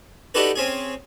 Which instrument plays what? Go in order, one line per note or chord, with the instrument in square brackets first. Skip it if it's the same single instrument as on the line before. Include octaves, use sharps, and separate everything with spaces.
[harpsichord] D4 D#4 F#4 G4 A4 B4
C4 C#4 G#4